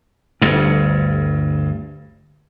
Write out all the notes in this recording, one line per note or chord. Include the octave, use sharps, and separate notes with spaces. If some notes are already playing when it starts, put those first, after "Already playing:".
G1 D2 G2